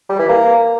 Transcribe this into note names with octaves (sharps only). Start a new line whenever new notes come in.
G3
E3
A#3